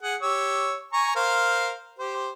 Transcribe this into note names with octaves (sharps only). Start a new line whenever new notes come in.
G#4 F#5
G4 C#5 E6
G#5 A#5 C#6
A#4 C5 F5
G4 C5